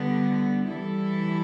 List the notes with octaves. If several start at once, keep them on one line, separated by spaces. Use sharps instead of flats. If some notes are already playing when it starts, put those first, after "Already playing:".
Already playing: D3 G3 B3
E3 G3 E4 A4